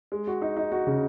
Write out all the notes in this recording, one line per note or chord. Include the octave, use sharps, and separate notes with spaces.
G#3
F#4
D#4
D#4
F#4
C#3